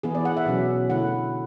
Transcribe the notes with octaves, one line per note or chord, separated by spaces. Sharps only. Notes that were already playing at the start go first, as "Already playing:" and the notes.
E3 B3 E4 G#4
D5
F#5
E5
B2 F#3 C#4
D3 A3 E4 F#5